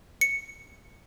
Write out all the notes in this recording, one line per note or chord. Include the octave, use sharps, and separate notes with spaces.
C#7